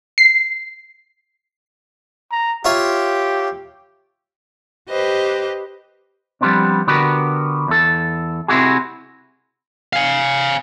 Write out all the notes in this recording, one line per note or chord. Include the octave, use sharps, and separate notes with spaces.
C7
A#5
E4 F4 G4 C#5
G4 B4 C5 D#5
F3 G3 A3 B3 C4 D4
D3 B3 F#4 G4 A#4 B4
E2 A4
C3 C4 D#4 E4 F#4 G#4
F5 G#5